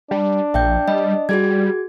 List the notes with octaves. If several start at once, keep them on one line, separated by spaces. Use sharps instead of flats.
G3 D4
A#1 E5 G5 G6
G3 D#5
G3 F#4 G#4 G#6